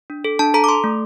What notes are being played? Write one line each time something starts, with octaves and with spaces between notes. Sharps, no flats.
D4
A4
D4 A5
A4 A#5
D6
A4 C6
A3